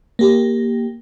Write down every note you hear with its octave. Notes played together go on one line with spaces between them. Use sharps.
A#3 G4